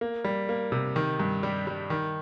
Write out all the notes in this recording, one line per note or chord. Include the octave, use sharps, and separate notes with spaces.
A#3
G3
A#3
C3
D#3
G2
G3
G3
D#3